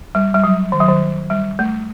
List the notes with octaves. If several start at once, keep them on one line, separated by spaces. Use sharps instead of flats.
G3
G3
F#3
D#3
F#3
D#3
G3
A3